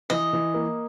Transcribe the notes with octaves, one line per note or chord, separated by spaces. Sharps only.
E3 D#5
E3
A#3